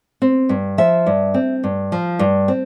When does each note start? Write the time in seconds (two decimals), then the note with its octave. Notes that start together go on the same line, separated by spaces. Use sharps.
0.22 C4
0.49 G2
0.78 F3 E5
1.07 G2
1.34 C4
1.64 G2
1.92 F3
2.19 G2
2.48 C4